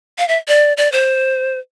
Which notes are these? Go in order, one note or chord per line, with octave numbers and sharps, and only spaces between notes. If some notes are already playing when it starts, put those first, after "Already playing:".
F5
E5
D5
D5
C5